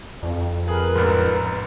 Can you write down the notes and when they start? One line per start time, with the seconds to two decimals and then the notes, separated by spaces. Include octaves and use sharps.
0.23 F2
0.68 G#4 A#4 B4
0.96 A1 G#2